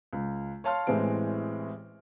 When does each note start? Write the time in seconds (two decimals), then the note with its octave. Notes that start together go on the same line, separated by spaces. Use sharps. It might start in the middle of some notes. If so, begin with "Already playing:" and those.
0.13 C#2
0.64 C#5 F5 A5 C6 F6
0.87 A1 A2 E3 G#3 C4 D7